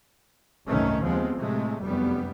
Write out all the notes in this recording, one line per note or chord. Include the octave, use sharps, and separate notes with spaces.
F#1 C2 G#2 D#3 A3 C#4
D#2 C#3 F3 G#3 B3 C4
A2 C3 G#3 A3
F1 F#2 G3 B3